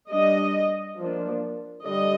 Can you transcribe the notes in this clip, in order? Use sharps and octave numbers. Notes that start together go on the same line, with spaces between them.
G3 D4 D#5
F3 A#3 D4
D3 G3 D#5